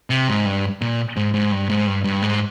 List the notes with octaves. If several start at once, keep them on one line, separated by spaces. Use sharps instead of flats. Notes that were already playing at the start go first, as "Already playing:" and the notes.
C3
G#2
G2
A#2
G#2
G#2
G2
G#2
G2
G2
G#2